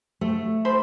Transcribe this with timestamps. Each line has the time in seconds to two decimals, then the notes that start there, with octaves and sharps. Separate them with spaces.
0.21 A3
0.65 C5 B5